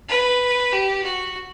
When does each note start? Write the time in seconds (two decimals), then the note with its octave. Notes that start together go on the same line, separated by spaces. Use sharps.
0.09 B4
0.72 G4
1.03 F#4